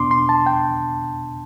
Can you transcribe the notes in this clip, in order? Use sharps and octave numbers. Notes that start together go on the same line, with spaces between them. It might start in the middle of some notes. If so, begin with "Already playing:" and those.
Already playing: E2 B2 B3 D4 C6 D6
C6
A5
G5